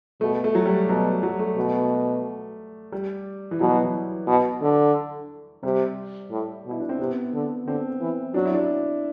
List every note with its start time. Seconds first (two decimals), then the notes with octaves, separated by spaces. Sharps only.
0.21 B2 A3
0.44 A3
0.55 F#3
0.66 G3
0.88 B2 F#3
1.23 F#3
1.39 A3
1.56 B2
2.92 G3
3.51 E3
3.60 B2 F#3
3.83 E3
4.27 B2
4.62 D3
5.63 C3 G3
6.31 A2
6.66 B2
6.71 E4
6.80 D4
6.89 C4
6.99 C3 B3
7.34 D3
7.66 D3 C4
8.00 E3
8.34 F#3 D4
8.45 E4
8.54 D4